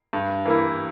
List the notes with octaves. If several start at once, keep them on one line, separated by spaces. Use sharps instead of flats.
G2
E3 A#3 E4